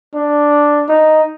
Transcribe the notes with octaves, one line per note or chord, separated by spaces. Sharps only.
D4
D#4